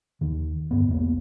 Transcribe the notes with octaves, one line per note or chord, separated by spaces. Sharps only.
D#2 D#3
D2 G2 B3
B1 E2 A#3 B3